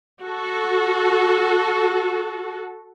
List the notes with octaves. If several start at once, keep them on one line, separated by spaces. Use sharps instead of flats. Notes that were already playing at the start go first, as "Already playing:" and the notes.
F#4 A4